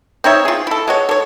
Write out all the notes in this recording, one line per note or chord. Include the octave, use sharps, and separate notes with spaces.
C4 D#4 C#5 E5
F4 G#4
E4 A4
G#3 F#4 C#5
A4 C#5